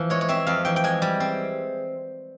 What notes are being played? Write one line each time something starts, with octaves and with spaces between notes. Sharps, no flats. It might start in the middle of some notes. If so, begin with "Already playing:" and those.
Already playing: E2 E3 F3
G#3 C#5
C#5
C4 E5
F2 F5
E3 G5
G5
G#3 G#5
G3
C4